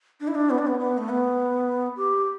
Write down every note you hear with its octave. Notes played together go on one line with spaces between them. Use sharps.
D4
E4
D4
B3
D4
B3
B3
A3
B3
G4